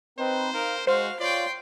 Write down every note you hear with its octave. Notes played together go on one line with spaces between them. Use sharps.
C4 D#4 B4 C5
D#4 A#4 F5
G#3 F#4 C5 F5
F4 C#5 D5 G5 C6